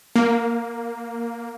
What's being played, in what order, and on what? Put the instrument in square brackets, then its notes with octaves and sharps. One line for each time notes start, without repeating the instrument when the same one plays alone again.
[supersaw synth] A#3